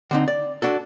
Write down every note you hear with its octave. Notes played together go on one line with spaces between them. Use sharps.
D3 C4 D#4
D5
D4 F#4 A4